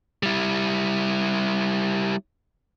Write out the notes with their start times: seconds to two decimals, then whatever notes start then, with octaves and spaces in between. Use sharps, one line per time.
0.23 G3 E4